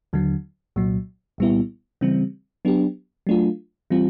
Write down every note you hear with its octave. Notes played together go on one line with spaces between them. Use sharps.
D#2 D3 F#3
C2 A#2 F#3
C2 A#2 G3 B3 E4
C#3 E3 G3 C4
F#3 B3 D4 G4
F#3 A3 D4 F4
E3 G3 C4 F4